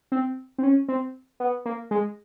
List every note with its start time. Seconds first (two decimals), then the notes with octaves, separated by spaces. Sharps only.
0.12 C4
0.58 C4
0.63 C#4
0.88 C4
1.40 B3
1.66 A#3
1.91 G#3